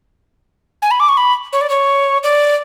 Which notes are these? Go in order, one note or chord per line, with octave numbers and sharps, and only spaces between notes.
G#5
B5
D6
C#6
B5
C#5
D5
C#5
D5